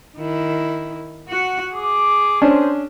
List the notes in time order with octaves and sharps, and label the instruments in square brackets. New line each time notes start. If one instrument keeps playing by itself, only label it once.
[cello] D#3 E4
F#4 F#5
[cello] G#4 [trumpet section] D6
[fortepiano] C#4 D4 [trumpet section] C5